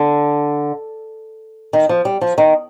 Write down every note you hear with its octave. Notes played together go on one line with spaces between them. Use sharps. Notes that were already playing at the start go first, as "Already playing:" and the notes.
Already playing: D3
D#3
F3
G3
F3
D#3